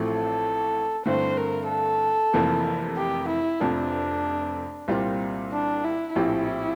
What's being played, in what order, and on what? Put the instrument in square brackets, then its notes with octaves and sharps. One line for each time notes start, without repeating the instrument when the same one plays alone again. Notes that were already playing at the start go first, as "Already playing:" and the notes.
Already playing: [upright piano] A1 A2 F3 A3 C4
[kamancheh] A4
[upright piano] G2 D3 A3 C4 E4 [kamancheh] C5
[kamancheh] A#4
A4
[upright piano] F1 F2 C3 E3 A#3
[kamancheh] G4
E4
[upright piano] F1 F2 C3 F3 [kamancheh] D4
[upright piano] C2 A#2 G3 C4 F4
[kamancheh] D4
E4
[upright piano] A#1 A2 F3 C4 G4 [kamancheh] E4